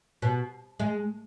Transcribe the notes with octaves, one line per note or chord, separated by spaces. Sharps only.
B2
G#3